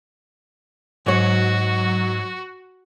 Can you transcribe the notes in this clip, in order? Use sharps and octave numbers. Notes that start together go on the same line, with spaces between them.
G#2 F#3 F#4 C#5